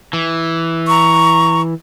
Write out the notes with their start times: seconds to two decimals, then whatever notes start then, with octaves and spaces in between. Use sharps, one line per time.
0.13 E3
0.87 A#5 C#6